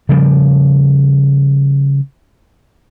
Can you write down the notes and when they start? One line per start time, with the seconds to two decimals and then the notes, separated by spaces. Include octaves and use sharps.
0.09 C#3 F3 G3